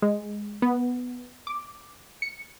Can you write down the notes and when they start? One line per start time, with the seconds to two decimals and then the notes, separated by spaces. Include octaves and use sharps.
0.02 G#3
0.62 B3
1.47 D6
2.22 C#7